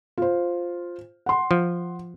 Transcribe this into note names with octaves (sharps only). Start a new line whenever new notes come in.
F4 C5
F#5 C6
F3